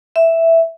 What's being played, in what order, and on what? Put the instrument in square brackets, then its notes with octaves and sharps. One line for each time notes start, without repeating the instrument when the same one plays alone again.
[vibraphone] E5